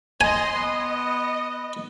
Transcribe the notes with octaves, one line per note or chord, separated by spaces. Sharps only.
D#5 G#5 C6
B3 D#5